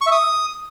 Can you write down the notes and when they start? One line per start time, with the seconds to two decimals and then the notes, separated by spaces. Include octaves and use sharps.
0.01 C#6
0.07 E5
0.12 D#6